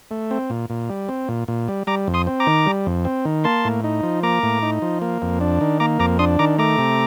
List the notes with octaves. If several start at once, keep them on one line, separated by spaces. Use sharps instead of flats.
A3
C4
A#2
A#2
G3
C4
A#2
A#2
G3
G3 A#5 D6
F2
C6 D#6
C4
A#5 D6
D#3
G3
F2
C4
D#3
A#3 A5 C6
A2
D#4
F3
A#3 A#5 D6
A2
D#4
F3
A#3
F2
D4
D#3
A#3 A#5 D6
F2 A#5 D6
D4 C6 D#6
D#3 A#5 D6
A3 A#5 D6
C3